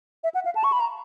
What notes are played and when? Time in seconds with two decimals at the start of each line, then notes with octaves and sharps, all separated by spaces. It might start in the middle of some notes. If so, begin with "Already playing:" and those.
0.24 E5
0.34 F#5
0.45 F5
0.55 A5
0.64 C#6
0.72 B5
0.80 A#5